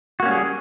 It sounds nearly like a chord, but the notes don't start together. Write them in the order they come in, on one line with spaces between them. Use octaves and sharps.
F#4 A#3 C#4 G3 G#4